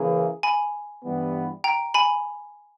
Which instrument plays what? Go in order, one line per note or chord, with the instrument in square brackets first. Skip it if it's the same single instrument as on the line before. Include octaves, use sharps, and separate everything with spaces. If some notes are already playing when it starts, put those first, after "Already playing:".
Already playing: [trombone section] C#3 E3 A#3 E4 G#4
[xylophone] G#5 B5
[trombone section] G2 E3 G3 B3
[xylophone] G5 A#5
G#5 B5